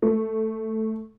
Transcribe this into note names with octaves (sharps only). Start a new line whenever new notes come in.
A3